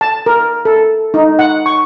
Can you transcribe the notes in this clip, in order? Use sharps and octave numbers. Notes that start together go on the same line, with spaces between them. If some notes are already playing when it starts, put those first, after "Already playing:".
A5
A#4
A4
D#4
F#5
C#6